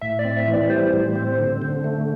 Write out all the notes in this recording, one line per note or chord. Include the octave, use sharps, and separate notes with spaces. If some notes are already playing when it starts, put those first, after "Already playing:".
A2 E5
D5
C4
E5
E3
D5
G3 C5
A2
C4
D3
D3
A3